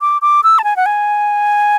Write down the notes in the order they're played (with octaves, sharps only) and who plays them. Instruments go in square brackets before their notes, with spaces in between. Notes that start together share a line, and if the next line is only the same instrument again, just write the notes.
[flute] D6
D6
E6
A5
G#5
F#5
G#5